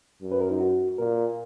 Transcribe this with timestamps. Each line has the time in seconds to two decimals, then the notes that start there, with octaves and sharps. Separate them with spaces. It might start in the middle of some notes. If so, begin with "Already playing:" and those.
0.22 F#2
0.32 B4
0.41 A#4
0.51 D#4
0.60 F#4
0.98 A#2 A#4